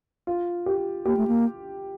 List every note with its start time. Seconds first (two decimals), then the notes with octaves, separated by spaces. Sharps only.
0.27 F4
0.66 G4
1.06 A#3 G4
1.17 A3
1.28 A#3